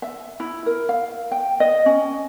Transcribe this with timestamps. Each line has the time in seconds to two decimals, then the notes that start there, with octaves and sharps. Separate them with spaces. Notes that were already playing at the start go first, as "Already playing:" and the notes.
0.02 E5
0.40 E4
0.66 A#4
0.89 F5
1.31 G5
1.60 D#5
1.86 C#4